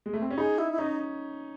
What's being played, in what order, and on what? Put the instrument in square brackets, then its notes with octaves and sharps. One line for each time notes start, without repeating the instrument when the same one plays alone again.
[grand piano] G#3
A3
C4
C#4
[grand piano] D#4 [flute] G#4
[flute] E4
E4
[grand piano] C#4 [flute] D#4